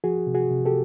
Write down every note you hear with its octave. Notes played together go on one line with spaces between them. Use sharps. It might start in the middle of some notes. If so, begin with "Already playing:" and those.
F3 F#4 G#4
C3
F#4 G#4
C3
G4 A4